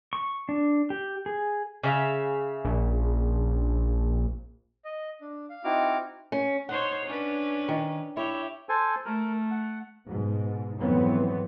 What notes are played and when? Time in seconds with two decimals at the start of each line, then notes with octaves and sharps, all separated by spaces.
0.13 C#6
0.49 D4
0.90 G4
1.26 G#4
1.83 C#3 E5 F5
2.65 A#1
4.85 D#5
5.21 D4
5.50 F5
5.64 C4 D#4 E4 F#4 D6 F6
6.32 C#4
6.69 D#4 C5 C#5 F#5
7.06 C#4 D4 B4
7.68 D#3
8.17 E4 G4 C#5
8.69 A4 C5 G#5
9.05 A3 A#4
9.51 F#5
10.07 G#2 B2
10.80 F2 G#2 E3 F#3 B3 C4